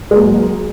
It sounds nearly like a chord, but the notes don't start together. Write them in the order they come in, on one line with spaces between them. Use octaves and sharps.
G#3 A#3 F#3